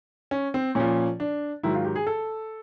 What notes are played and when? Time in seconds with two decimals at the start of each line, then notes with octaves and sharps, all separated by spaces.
0.31 C#4
0.54 C4
0.75 A#2 F3 C#4
1.20 D4
1.63 G#2 D#3 F#3 E4
1.74 F4
1.85 G4
1.96 G#4
2.07 A4